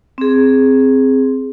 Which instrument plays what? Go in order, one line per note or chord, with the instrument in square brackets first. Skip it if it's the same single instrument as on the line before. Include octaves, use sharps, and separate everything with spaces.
[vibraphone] C4 G#4